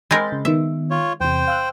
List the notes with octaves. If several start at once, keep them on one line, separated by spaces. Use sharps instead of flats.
G#3 C4 A#4 B5 G6 A6
C#3
D#3 B3 E5
F4 C#5
E2 C3 C5 G5
F5 E6 F#6